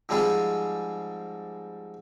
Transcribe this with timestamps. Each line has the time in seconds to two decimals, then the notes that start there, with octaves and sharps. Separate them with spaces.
0.09 G#2 F3 G3 C4 G#4 B5